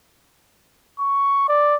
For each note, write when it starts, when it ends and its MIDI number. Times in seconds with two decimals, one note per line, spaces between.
1.00 1.48 85
1.48 1.75 74